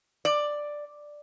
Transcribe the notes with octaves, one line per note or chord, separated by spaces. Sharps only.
D5